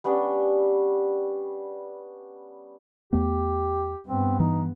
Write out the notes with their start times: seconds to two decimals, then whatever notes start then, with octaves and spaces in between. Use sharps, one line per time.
0.04 G3 B3 C#4 D4
3.13 E2 A3 B3 G4
4.07 G2 B3 C4
4.40 E3 D#4